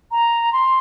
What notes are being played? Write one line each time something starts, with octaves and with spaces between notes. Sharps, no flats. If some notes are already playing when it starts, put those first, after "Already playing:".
A#5
C6